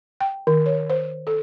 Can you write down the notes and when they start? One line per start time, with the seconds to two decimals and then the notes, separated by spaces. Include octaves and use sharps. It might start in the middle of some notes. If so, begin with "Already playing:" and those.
0.21 G5
0.47 D#3
0.66 C#5
0.90 C5
1.27 A4